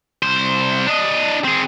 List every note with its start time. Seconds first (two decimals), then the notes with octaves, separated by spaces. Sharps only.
0.22 C2 C5
0.87 D4 D#5
1.44 C4 G#4